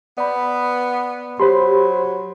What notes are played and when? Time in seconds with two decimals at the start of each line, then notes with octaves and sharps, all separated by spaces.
0.18 B3 D5 B5
1.40 F#3 G4 C5 B5 C6